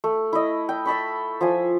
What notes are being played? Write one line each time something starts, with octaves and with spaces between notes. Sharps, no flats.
A3
E4 D#5
G5
E5 A5 B5 C#6
F3 E5 G#5